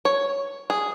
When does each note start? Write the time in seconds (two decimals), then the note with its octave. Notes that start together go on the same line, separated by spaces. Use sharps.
0.05 C#5
0.70 G#4